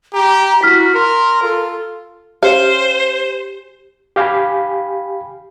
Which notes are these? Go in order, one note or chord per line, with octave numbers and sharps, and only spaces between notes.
G4 A#5
E4 F#4 F6 B6
A#4 C6
F4 A4
C#4 G4 C5 F5
G4 F5 G5 G#5 B5